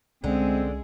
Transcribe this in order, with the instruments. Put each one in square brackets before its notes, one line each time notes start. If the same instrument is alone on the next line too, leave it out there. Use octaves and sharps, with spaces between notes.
[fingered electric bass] C2 C#4 [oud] D3 [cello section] G#3 G#4 [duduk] C4